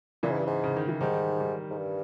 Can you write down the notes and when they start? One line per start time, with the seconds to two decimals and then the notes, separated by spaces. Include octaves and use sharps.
0.23 A#2 C#3 E3
0.31 G#2
0.38 G2
0.46 G#2
0.64 C#3
0.76 D#3
0.88 E3
1.01 G#2 D#3 G3
1.40 D#3 G3
1.70 G#2
1.78 G2